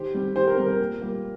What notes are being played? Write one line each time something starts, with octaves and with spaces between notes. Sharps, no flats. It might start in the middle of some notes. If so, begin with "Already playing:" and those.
Already playing: D#3 G4 C5
G3 C4
D#3 G4 C5
A#4
G3 C4 A#4
A#4
A#2
G3 A#3